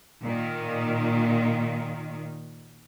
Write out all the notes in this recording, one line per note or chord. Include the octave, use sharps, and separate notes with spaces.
A#2 D#3